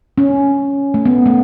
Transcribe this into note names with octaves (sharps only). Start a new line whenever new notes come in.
C#4
A3
B3
A3